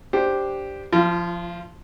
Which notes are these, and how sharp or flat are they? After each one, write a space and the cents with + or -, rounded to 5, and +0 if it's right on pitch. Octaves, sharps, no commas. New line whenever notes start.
D4 +0 G4 +0 C5 +0
F3 +0 F4 -30